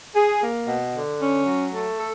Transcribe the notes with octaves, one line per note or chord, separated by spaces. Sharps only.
G#4
A#3
B2
D3
C#4
F#3
A3
A4